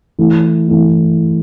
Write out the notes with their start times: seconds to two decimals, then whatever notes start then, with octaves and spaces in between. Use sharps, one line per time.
0.18 E3 A3 E4
0.68 E3 A3 E4